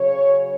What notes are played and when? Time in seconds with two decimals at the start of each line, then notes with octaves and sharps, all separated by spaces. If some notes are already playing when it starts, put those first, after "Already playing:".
Already playing: C#3 F#3 C#4 C#5